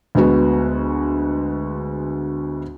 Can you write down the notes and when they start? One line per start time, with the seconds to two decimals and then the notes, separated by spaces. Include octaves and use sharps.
0.15 D2 G#3 B3 F#4